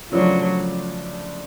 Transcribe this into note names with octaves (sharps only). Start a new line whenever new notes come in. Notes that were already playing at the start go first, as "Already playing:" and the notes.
C#3 F3 F#3 A3 D4